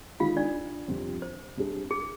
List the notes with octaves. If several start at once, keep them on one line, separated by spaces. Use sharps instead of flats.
D#3 G#3 D#4 F4 G#4 F5
D4 D5
F2 C3 G3 C4 F4
C5
C3 G3 D4 G#4
G#4